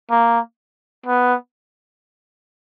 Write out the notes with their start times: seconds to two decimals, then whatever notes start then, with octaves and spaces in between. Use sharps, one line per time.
0.11 A#3
1.06 B3